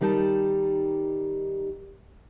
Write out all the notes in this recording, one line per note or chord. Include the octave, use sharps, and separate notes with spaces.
D#3 G3 D#4 G4 A5